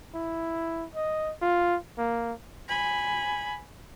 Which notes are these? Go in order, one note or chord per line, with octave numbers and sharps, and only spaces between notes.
E4
D#5
F4
A#3
G#5 B5